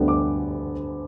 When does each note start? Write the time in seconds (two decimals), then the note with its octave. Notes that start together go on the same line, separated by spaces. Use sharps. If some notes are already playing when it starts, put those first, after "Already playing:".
Already playing: D2 D3 G3 B3
0.08 D6